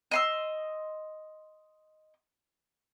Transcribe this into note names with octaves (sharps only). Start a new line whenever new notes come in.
D#5 C6 E6